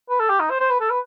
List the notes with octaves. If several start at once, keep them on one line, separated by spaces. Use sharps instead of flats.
B4
A4
G4
D#4
C5
C5
B4
A4
B4